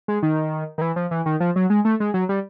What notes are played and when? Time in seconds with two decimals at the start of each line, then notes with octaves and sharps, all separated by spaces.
0.08 G#3
0.23 D#3
0.78 D#3
0.81 E3
0.96 F3
1.11 E3
1.26 D#3
1.40 F3
1.56 F#3
1.70 G#3
1.85 A3
2.00 G#3
2.14 F#3
2.29 G3